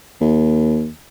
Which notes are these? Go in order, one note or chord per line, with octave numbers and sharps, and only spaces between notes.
D#2